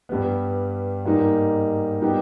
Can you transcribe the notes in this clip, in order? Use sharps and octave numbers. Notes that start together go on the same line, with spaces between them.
G2 G3 B3
G#2 G3 A#3 D#4
G3 B3 D#4 G4